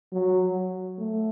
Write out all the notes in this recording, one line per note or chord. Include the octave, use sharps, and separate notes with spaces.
F#3
A3